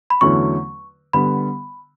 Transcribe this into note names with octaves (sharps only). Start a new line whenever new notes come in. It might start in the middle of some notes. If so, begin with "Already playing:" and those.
B5
E2 D3 F#3 A3 C#4 C#6
D3 G3 B3 B5